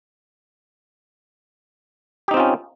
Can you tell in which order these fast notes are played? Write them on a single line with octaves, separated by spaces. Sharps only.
G4 D#4 C4 F4 C#4